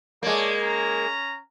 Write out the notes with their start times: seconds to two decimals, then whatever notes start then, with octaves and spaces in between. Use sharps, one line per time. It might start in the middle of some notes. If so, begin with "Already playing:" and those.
0.23 G#3 A#3 A4 C#5 D5
0.63 C#4 A#5